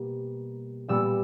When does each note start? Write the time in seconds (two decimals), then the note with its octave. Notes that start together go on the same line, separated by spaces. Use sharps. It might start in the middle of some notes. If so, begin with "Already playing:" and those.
Already playing: B2 G3 A#3
0.88 A#2 G3 B3 E6